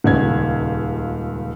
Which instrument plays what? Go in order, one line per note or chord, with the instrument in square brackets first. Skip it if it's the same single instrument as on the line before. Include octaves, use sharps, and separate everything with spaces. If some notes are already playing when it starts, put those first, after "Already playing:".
[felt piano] D#1 C#2 G#6